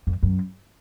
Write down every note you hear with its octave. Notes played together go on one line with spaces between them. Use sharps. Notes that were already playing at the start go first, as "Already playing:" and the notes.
F2
F#2